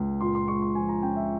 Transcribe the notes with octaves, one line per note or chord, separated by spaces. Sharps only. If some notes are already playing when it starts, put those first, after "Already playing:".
Already playing: C#2
A#2 C6
C6
G#3 C#6
C6
F3 G#5
A#5
C#4 G5
E5